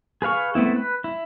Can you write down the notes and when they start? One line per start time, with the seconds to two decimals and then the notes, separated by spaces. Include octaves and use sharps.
0.22 G#4 B4 F5 C#6
0.55 A3 B3 C4 E4
0.76 B4
1.04 E4